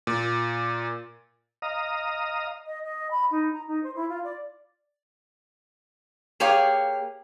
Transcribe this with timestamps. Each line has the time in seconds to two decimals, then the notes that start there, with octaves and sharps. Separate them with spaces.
0.07 A#2
1.62 D#5 F5 A#5 D#6
2.66 D#5
2.83 D#5
3.11 B5
3.31 D#4
3.53 A#5
3.67 D#4
3.83 C5
3.95 E4
4.09 F4
4.24 D5
6.40 A#3 G4 G#4 C#5 F5